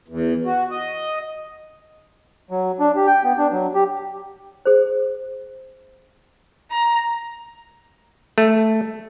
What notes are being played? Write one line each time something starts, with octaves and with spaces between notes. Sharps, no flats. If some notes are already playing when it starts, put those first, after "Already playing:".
E2
F#4
D#5
F#3
D4
G4
G5
B3
D4
F#3
G4
G#4 C5
A#5
A3